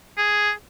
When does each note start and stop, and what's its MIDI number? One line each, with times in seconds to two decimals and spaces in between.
0.18 0.52 68